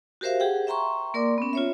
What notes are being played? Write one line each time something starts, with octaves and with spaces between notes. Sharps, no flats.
F#4 G4 A#4 C5 E5 F5
G4 G#4 F#5 G5
E5 G5 A#5 C6 C#6
A#3 A#4 D5 C6 D6
B3 C#4
F4 C#5 E5